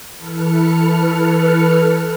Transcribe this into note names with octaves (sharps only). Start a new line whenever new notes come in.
E3 A4 B4 F6 C#7